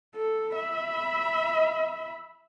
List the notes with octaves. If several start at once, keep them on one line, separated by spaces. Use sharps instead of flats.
A4
E5 B5